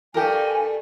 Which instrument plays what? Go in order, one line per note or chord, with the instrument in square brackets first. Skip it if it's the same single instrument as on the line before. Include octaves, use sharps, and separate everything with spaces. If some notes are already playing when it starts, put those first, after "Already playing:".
[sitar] G2 A3 A4 [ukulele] G4 A#4 [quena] G#5